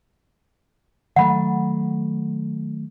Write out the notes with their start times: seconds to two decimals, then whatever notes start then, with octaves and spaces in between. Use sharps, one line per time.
1.16 D#3 F#3 A3 F#5 B5